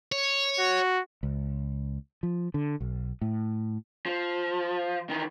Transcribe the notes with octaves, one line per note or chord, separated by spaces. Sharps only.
C#5
F#4
C#2
F3
D3
B1
A2
F3
D#3 E3